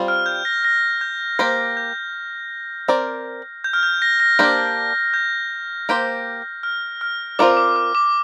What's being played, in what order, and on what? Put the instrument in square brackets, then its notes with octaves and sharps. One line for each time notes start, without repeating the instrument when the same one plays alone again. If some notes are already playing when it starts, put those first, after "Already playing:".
Already playing: [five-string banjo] G3 C4 F4
[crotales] F6
G6
A#6
A#6
G6
[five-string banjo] A#3 G4 C5 [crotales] G6
[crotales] G6
[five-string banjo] C4 A#4 D5
[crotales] G6
F6
G6
A#6
A#6
[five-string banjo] A#3 D4 G4 C5
[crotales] G6
[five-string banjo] A#3 G4 C5
[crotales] F6
F6
[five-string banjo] C4 F4 A#4 D5 [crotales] D6
[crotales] D6
F6
D6